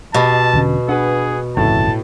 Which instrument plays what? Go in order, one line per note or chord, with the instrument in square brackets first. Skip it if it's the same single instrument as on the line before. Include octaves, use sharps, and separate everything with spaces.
[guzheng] B2 [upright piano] G4 D#5 [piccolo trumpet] A5
[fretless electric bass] E1 D3 C#4
[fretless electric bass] D4 [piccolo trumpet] G#4 [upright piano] B4 F#5
[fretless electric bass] G1 F2 C#3 [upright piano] A2 E4 [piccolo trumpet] A5